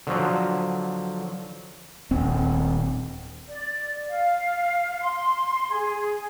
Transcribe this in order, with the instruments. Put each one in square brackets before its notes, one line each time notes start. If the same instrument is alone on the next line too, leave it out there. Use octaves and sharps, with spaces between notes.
[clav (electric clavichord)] D3 F3 F#3
[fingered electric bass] D#1 C4
[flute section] D5
F5
C6
G#4